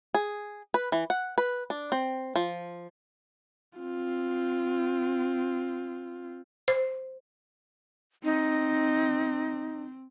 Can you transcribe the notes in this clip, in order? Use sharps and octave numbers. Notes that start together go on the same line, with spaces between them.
G#4
B4
E3
F#5
B4
D4
C4
F3
C4 F4
C5
C4 D#4